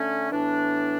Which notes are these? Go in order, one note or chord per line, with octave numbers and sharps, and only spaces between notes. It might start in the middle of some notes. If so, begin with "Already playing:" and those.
Already playing: D3 A3 C#4
A2 E3 B3 D4